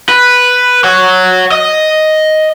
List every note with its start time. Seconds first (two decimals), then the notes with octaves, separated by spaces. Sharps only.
0.09 B4
0.84 C#5 F#5
1.51 D#5